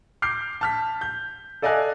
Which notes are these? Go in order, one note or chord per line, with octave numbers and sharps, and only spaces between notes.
D6 F6 G6 C7
A5 F6 B6
G6
A4 D5 D#5 F5 G#5 F#6